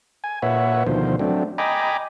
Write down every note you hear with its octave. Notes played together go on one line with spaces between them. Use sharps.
G#5
A#2 B4 C#5 E5 F#5
D2 B2 D#3 F3 C5
F#3 A3 C4 D4
D#5 G5 G#5 A#5 B5 D6